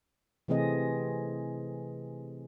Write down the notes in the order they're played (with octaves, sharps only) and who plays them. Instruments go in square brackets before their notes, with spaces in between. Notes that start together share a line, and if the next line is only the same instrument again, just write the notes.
[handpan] C3 E3 A3 C4 G#4 D#5